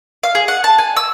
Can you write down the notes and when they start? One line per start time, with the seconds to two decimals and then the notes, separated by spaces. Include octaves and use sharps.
0.23 F5
0.35 G#4
0.48 F#5
0.64 A5
0.78 G#5
0.97 E6